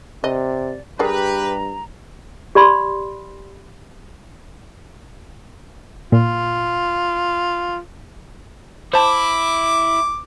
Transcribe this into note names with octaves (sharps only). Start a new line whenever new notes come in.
C3 D5 D#5
G2 G4 G#4 A#4 B4 D5 A#5
G4 D5 B5 C6
A#2 F4
E4 C5 A5 D6